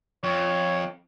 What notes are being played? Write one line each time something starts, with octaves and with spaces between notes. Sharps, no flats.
F2 C#5